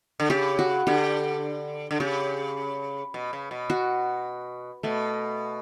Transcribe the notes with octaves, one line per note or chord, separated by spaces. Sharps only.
D3
C#3 G4
F#4
D3 G4
D3
C#3 G4
B2
C#3
B2
F#4
B2 A3